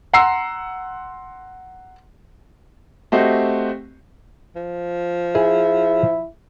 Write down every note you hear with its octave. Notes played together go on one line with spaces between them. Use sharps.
F#5 A#5 C6 E6 C7
A3 C4 F#4 G4 C5 D#5
F3
E4 G#4